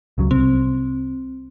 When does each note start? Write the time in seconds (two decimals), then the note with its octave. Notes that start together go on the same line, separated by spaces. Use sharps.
0.18 C#2 C#3 F#3
0.31 C2 C4